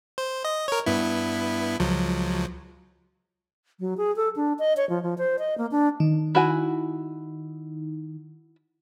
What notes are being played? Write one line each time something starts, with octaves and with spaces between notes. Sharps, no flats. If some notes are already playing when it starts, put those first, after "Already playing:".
C5
D#5
A#4 C#5
G2 B3 E4
C#2 F3 F#3
F#3
G#4
A4
D4
D#5
C#5
F3
F3
C5
D#5
A#3
D4
D#3 D#4
E4 F#4 G#5